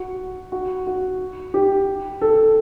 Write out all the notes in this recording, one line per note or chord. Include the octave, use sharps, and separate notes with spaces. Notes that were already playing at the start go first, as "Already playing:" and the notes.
Already playing: F#4
F#4
F#4
G4
A4